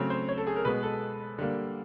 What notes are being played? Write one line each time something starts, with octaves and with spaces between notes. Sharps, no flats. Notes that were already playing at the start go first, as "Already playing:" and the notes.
Already playing: C#3 F#3 A3 C4 C#5
C5
C#5
A4
G#4
A#4
B2 G#3 B3 B4
A4
D3 G3 A#3